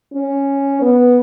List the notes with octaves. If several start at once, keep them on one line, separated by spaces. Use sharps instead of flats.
C#4
B3